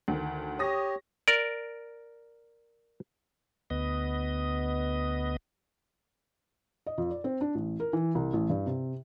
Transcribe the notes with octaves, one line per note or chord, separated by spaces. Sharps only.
D2 D#3
G4 C#5 D#6 A#6
A#4 D5
D2 B3 D#5
D#5
F2
D5
C4
D4
A1
A#4
E3
C2
A1
G2
C3